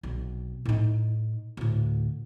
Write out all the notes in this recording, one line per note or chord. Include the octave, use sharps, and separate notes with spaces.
B1 C3
A2 D#4
D2 A2